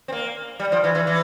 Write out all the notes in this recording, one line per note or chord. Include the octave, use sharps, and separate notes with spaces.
C4
A#3
G3
F3
E3
E3
E3